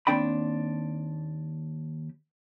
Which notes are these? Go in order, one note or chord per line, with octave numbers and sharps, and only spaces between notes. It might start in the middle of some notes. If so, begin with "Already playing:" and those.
D#2 A3 C4 D4 G5 B5